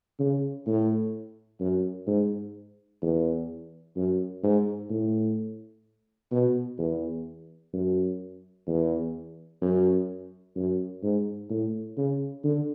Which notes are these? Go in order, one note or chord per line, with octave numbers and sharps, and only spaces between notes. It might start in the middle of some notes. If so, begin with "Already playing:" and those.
C#3
A2
F#2
G#2
E2
F#2
G#2
A2
B2
E2
F#2
E2
F#2
F#2
G#2
A2
C#3
D3